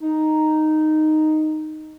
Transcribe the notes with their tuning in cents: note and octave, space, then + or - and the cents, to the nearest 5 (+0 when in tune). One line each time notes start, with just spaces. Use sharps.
D#4 -5